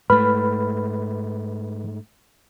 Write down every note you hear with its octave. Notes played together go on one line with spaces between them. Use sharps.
G#2 A3 B4 B5 F6